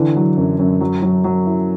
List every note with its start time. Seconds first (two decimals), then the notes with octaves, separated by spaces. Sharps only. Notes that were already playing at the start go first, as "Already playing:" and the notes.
Already playing: D3 E3
0.16 F#3
0.37 F#2
0.59 F#2
0.81 F#3
1.02 F#3
1.24 F#3
1.46 E4